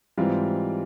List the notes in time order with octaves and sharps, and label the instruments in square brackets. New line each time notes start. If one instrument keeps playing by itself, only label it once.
[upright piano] G#2 E3 G3 C4 F4